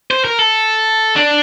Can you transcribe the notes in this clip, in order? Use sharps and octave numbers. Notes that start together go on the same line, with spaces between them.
C5
A#4
A4
D4